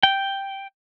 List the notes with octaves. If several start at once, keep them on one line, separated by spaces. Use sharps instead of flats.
G5